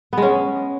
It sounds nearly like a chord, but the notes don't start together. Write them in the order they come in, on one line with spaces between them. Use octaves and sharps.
B3 G#3 C#4